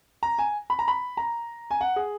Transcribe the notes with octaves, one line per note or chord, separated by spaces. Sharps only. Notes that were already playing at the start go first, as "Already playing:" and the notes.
A#5
G#5
B5
A#5
B5
A#5
G#5
F#5
G#4